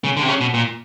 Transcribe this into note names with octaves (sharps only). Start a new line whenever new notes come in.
C#3
D3
C3
C#3
B2
A#2